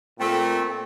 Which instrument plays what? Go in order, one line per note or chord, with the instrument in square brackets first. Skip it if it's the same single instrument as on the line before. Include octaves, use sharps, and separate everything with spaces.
[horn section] A#2 A3 [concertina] C4